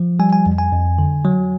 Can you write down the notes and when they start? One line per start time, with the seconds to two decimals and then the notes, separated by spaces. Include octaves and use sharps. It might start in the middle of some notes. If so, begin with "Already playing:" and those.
Already playing: F3
0.20 G3 G#5
0.33 G#5
0.46 F2
0.58 G#5
0.72 F2
0.99 D3
1.25 F#3